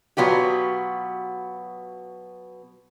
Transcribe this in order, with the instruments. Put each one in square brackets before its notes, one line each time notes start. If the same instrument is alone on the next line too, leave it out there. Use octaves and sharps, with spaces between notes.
[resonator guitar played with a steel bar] B2 F#3 B3 F4 G4